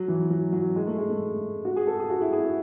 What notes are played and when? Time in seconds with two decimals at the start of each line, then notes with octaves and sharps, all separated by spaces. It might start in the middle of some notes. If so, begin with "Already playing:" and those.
Already playing: F#3
0.08 E3
0.30 F#3
0.52 F#3
0.76 G#3
0.87 A3
0.98 G#3
1.10 A3
1.65 F#4
1.76 G#4
1.87 A4
1.99 G#4
2.10 F#4
2.21 E4
2.32 G#4
2.43 F#4